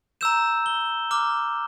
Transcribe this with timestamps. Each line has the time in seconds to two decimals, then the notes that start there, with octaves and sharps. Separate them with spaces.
0.21 A#5 E6 G6 E7
0.66 G7
1.11 A#5 D6 F6